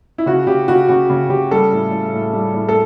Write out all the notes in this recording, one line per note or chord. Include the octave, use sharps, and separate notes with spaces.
E4
C#3 F#4
C#3 G4
C#3 F#4
C#3 F#4
C#3
C#3 G4
G3 A4
A2
A2
A2
G3
A2
A4